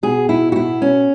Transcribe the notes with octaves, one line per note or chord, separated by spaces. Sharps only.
B2 G#4
B2 E4
F#4
B2 E4
B2 C#4